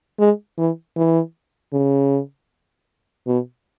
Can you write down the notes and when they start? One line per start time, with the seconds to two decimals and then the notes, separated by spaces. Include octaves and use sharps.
0.19 G#3
0.58 E3
0.97 E3
1.73 C#3
3.27 B2